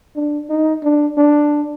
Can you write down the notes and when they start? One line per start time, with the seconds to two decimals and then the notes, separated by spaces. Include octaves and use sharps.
0.16 D4
0.50 D#4
0.84 D4
1.18 D4